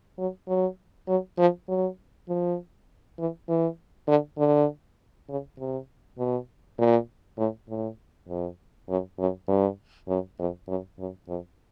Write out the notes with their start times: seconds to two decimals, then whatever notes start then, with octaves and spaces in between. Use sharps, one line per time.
0.18 F#3
0.48 F#3
1.08 F#3
1.38 F3
1.68 F#3
2.29 F3
3.19 E3
3.49 E3
4.08 D3
4.38 D3
5.29 C#3
5.59 C3
6.18 B2
6.78 A#2
7.38 A2
7.69 A2
8.28 F2
8.89 F#2
9.19 F#2
9.48 G2
10.08 F#2
10.39 F2
10.68 F#2
10.99 F#2
11.28 F2